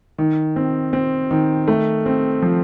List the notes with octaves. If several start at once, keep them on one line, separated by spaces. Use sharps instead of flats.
D#3
C4
C4
D#3
A3
C4
F3